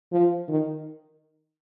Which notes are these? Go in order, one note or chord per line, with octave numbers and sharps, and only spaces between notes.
F3
D#3